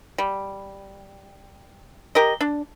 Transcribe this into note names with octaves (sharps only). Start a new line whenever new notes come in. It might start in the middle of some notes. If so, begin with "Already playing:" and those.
G3
G4 A#4 D#5
D4